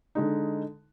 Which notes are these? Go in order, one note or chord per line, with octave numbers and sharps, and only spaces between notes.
D3 G#3 D#4